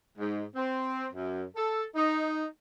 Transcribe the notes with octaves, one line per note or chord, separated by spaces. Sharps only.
G#2
C4
F#2
A4
D#4